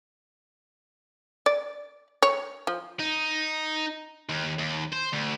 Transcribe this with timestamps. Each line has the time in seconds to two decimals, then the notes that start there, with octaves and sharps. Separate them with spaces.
1.46 D5
2.23 C#5
2.67 F3
3.00 D#4
4.29 D#2
4.59 D#2
4.92 C5
5.13 D2